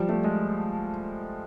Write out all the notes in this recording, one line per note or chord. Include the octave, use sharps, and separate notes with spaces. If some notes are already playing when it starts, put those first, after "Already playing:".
Already playing: F3 G3
A3
G#3